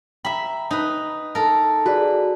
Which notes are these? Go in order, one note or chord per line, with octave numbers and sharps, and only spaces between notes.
E5 G5 A#5 B5
D#4 B4
A4 A#4
F#4 G#4 B4 D5